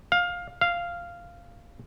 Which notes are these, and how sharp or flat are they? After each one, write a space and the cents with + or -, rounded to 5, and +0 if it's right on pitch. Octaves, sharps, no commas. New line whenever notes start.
F5 +15
F5 -10